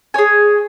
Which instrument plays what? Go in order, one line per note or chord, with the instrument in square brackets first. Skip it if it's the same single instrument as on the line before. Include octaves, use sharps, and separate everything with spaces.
[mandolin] G#4 C#5 G#5